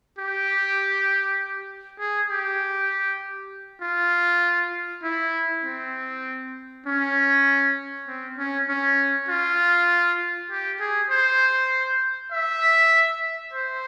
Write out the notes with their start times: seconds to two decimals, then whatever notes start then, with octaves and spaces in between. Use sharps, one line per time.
0.18 G4
1.99 G#4
2.30 G4
3.82 F4
5.03 E4
5.64 C4
6.86 C#4
8.07 C4
8.38 C#4
8.69 C#4
9.29 F4
10.51 G4
10.80 G#4
11.10 C5
12.32 E5
13.53 C5